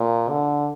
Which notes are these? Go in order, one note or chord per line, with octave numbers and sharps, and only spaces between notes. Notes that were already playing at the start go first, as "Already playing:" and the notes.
Already playing: A#2
D3